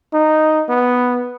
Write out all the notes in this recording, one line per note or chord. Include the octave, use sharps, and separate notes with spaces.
D#4
B3